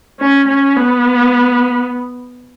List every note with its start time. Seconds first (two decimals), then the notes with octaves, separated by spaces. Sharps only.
0.20 C#4
0.48 C#4
0.76 B3